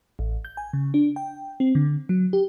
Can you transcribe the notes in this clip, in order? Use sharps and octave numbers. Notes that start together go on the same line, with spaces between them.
A1
G6
G#5
C#3
D4
G5
C4
D3
F#3
G4